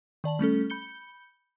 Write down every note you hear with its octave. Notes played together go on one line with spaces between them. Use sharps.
D#3 D5 A5 F#7
G3 A3 C#4 A4
B5 G6 C#7 G7